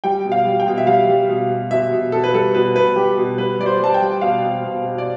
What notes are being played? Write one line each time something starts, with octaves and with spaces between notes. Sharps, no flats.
G3 G5
B2
F5
G3
G5
B2
E5
G3 F5
G3
B2
B2
B2 E5
B2
B2 A4
B4
G3 A4
B2 B4
B2 B4
G3 G4
B2
G3 B4
G3 D5
C5
G3 A5
G5
G3
B2 F5
B2
B2
B2
D5